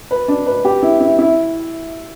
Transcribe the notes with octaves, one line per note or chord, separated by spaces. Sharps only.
B4
D4
B4
G4
E4
E4
E4